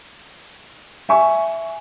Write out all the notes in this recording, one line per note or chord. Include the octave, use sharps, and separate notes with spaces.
E5 G#5 C#6